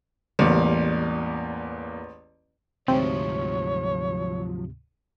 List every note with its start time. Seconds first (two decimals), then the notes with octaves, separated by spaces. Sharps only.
0.39 A1 E2 G3 A#3
2.88 D2 G#2 C3 F3 F#3 C4 C#5